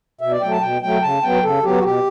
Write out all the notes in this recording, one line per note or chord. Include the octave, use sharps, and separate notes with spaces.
B2 E5
D5
F#3 A3 G5
A5
B2 G5
F#3 A3 G5
C#3 A5
F#3 B3 G5
C#3 A4
F#3 B3 G4
F#4
B2 G4